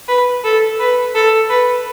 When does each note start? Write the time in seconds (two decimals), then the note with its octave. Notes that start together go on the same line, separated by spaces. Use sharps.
0.08 B4
0.44 A4
0.79 B4
1.15 A4
1.50 B4